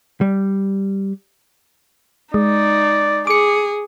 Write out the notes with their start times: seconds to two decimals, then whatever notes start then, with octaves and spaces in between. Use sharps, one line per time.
0.21 G3
2.34 G#3 D#4 D5
3.27 G#4 D6 C#7